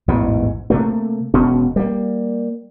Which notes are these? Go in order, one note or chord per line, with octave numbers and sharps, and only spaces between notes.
A1 E2 G#2 B2
C3 A3 A#3
E1 B2 C#4
G3 A#3